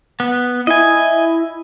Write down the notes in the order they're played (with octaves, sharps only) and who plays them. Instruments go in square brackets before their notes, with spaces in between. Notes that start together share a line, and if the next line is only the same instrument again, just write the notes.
[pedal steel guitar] B3
[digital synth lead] E4 [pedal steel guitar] D#5 G#5